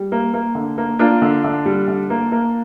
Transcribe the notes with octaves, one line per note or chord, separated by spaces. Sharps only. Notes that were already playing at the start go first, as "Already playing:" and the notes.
Already playing: G3
A#3
A#3
D3
A#3
A#3 D4 F4
D3
D3
G3
D3
A#3
A#3